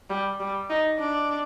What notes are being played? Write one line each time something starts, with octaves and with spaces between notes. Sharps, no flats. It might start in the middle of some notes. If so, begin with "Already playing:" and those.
G3
G3
D#4
D4